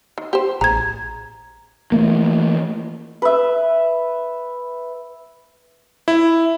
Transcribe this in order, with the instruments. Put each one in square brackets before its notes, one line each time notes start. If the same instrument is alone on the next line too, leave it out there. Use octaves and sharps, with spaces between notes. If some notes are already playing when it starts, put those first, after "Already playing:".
[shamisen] D#3
G4 C5
[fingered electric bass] A1 [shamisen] G#4 [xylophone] A#5 G#6
[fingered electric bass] E3 A3 A#3
[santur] B4 E5
[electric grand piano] E4